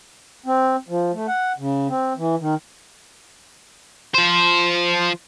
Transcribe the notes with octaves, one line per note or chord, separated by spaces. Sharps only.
C4
F3
A3
F#5
C#3
C4
E3
D#3
F3 C5